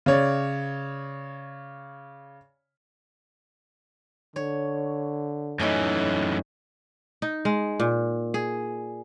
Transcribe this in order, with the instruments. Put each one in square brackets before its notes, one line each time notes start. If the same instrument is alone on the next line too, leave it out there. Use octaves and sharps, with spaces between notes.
[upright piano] C#3 C#5 D5
[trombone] D3 [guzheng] C#5
[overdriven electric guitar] F#2 E3 [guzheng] A3 C#4 D#4
[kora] D#4
G#3
A#2
G#4